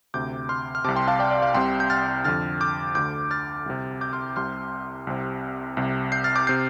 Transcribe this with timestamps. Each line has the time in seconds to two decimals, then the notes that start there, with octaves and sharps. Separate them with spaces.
0.14 D2 C3 D6 G6
0.49 C6 F6
0.75 F6
0.84 C3 A5 D6
0.88 C2
0.96 G5 C6
1.07 F5 A5
1.19 D5 G5
1.31 D5
1.42 F5
1.54 C2 C3 G5 C6
1.80 G6
1.90 F6 A6
2.24 F2 D3 F6 A6
2.61 D6 G6
2.95 D2 D3 D6 G6
3.31 F6 A6
3.66 C2 C3
4.01 D6 G6
4.13 C6 F6
4.36 C2 C3 C6 F6
5.07 C2 C3
5.77 C2 C3
6.12 G6 C7
6.24 F6 A6
6.36 D6 G6
6.47 C3 G6 C7